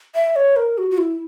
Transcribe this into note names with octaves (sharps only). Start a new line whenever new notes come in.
E5
C#5
A#4
F#4
F#4
E4